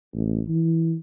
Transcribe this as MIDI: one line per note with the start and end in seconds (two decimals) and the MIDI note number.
0.14 0.41 33
0.49 0.95 52